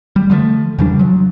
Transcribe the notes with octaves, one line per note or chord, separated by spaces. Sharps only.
G3
D3 F3 A3
E2 C#3 G3 D4
F3 F#3